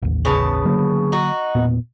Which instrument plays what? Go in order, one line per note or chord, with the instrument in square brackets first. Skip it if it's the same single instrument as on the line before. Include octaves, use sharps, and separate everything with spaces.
[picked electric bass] A1 D#2
[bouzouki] C#3 B3 A5
[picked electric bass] D3 F#3 A#3
[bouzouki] D#4 F#4
[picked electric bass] E1 A#2 B3